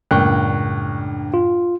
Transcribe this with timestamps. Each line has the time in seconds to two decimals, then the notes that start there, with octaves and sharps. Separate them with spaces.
0.11 C#2 F#2 A2 A#3 D4 G5 C#6 F#6
1.34 F4